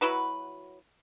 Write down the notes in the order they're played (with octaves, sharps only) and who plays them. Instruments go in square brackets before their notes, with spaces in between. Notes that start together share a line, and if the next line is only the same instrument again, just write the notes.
[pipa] F#3 E4 F#4 B4